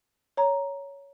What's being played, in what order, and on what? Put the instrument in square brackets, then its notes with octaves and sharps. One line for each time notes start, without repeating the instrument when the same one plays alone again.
[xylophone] C#5 A#5